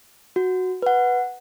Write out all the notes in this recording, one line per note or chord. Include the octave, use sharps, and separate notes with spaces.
F#4
B4 F#5